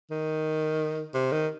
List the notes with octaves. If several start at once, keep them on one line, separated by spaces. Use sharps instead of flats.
D#3
C3
D#3